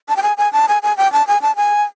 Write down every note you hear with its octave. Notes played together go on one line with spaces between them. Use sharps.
A5
G5
G#5
G#5
A5
G#5
G#5
G5
A5
G#5
A5
G#5